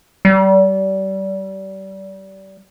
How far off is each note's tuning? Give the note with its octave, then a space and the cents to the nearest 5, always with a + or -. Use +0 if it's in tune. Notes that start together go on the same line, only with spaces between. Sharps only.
G3 -30